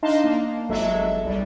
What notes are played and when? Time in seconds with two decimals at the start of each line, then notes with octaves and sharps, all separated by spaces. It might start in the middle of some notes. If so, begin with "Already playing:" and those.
0.03 D4 D#4 D#5 F5 A5 C6
0.24 A#3
0.69 G1 F#3 G#3 A4 E5
1.25 B1 G3